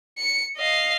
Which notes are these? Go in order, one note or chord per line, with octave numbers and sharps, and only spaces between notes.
C#7
D#5 F5